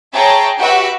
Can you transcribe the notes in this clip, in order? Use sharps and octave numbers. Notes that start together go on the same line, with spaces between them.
G#4 C#5 E5 G5 A5 A#5
F#4 G4 B4 E5 F#5